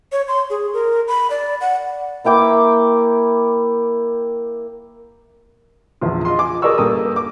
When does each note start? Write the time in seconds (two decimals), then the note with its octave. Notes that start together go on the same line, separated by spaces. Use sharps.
0.12 C#5
0.28 C6
0.50 G#4
0.74 A#4
1.08 B5
1.30 D5
1.61 F#5
2.24 A#3 E4 G5 D6
6.01 A#1 E2 F4
6.25 F4 D#5 C6
6.39 G#5 D6
6.62 G#4 A#4 D5 D#5 C#6 E6
6.78 G2 A#3 A4 D#6
7.16 D6